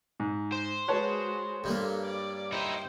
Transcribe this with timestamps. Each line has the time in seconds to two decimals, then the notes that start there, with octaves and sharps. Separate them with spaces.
0.20 G#2
0.52 C5
0.88 G#3 F#4 G#4 B4 C#5 A5
1.64 G2 G3 A#3 A4
2.06 D5
2.52 D#4 E4 C5 G5